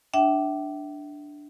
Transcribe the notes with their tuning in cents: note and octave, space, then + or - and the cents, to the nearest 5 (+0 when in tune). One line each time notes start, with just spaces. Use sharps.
D4 +0 E5 +0 G5 -40